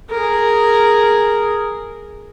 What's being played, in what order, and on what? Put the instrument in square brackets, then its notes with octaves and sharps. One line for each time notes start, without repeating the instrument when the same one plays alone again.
[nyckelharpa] G#4 A#4